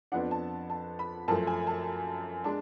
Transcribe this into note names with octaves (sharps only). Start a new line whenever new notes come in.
F2 F3 B3 D4 F#5
A5
A5
B5
F#2 F3 A3 A5
G#5
A5
G#3 D4 A5